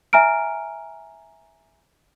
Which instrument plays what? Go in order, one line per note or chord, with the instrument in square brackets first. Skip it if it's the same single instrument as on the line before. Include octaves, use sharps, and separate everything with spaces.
[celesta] E5 G#5 A#5 F6 D7